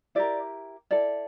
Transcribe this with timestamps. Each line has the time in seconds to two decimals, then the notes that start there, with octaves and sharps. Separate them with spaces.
0.15 E4 G4 A#4 D5
0.91 E4 A4 D5